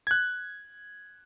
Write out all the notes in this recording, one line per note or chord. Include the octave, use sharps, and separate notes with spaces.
F#6 G#6